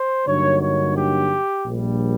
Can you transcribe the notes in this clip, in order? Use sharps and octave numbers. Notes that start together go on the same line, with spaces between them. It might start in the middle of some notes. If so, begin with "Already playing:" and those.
Already playing: C5
G2 D3 F#3 A#3 D#4 C#5
C#5
G4
A#1 A#2 G3